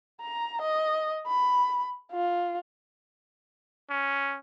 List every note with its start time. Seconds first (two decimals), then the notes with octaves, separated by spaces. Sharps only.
0.21 A#5
0.62 D#5
1.27 B5
2.12 F4
3.90 C#4